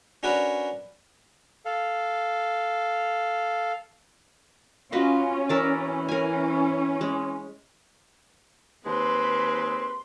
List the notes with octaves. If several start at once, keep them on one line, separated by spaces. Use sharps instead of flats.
C#4 D4 F#4 A#4 B4 C#5
A4 F5
C#4 F4 F#4 B4 D#5
E3 E4 A#4 D5
C#4 A#4 G#5
G#3
D#2 G#3 C4 B4 C6